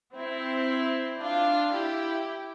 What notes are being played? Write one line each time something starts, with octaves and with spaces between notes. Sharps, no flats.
C4 E4
D4 F4
E4 G4